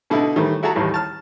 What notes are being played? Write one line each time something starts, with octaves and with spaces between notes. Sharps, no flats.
B2 D3 D#4 E4
A2 D#3 E3 G3 A3
E4 F#4 G#4 A4 A5 A#5
A1 D#2 A2 E3 G3
A5 F6